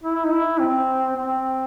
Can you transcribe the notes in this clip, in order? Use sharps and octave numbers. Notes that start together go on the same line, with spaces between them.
E4
D#4
E4
C4
C4